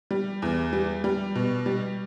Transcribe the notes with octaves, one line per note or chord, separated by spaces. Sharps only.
G3
E2
G3
G3
B2
G3